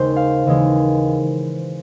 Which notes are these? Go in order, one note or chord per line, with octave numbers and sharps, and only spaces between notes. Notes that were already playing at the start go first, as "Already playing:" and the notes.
Already playing: D#2 C#3 G#3 C5
F5
D#2 C#3 E3 G#3